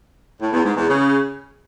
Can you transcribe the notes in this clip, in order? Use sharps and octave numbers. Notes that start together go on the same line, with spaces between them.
A2
E2
G#2
E2
C#3